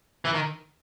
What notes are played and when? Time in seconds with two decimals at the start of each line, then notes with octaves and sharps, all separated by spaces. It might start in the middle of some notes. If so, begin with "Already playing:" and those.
0.25 E3
0.34 D#3